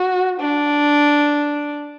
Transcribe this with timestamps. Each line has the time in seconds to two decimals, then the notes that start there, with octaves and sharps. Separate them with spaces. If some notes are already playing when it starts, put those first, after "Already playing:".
Already playing: F#4
0.40 D4